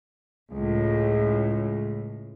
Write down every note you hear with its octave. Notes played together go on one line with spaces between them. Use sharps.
C#2 A2